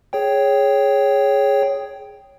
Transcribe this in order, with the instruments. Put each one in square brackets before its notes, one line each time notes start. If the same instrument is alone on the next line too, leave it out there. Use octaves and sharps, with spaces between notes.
[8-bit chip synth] G#4 C#5 G5